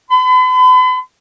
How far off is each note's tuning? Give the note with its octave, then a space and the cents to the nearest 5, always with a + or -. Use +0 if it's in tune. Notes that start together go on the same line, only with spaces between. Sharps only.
B5 +40